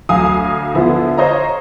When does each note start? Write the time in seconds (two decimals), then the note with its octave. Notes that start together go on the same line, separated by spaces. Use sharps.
0.09 D2 F#3 F5 G#5 D#6
0.75 D3 F3 B3 E4
1.18 C5 C#5 D#5 F5 A#5